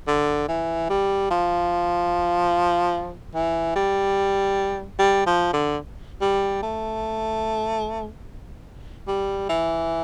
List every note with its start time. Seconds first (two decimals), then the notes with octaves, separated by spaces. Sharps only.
0.07 D3
0.48 E3
0.90 G3
1.31 F3
3.35 E3
3.76 G3
4.99 G3
5.26 F3
5.53 D3
6.21 G3
6.62 A3
9.08 G3
9.49 E3